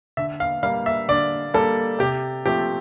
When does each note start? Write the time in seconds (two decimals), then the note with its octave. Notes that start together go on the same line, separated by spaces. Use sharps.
0.17 D3 E5
0.40 F5
0.63 G3 A#3 F5
0.86 E5
1.08 D3 D5
1.54 G3 A#3 A4
1.99 C3 G4
2.46 F3 A3 C4 G4